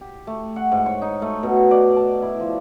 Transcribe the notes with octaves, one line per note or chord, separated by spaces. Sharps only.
G4
A3
F#5
G#2
C#5
D#4
A3
B2
D5
A5
E4
F3